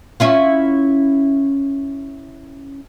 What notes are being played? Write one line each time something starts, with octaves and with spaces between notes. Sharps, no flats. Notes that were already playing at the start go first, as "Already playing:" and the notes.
C#4 E4 F4